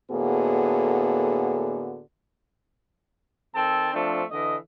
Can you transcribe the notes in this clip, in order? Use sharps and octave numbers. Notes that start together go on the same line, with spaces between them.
A2 D3 A#3 B3 F#4 G#4
D#3 C4 A4 A5
F3 A3 C4 D4
D3 E3 D#5